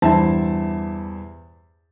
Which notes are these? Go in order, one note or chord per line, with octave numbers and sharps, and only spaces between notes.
E2 G2 E4 C5 E5 A5